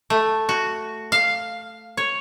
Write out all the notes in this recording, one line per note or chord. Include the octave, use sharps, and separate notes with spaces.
A3
F#4
F5
C#5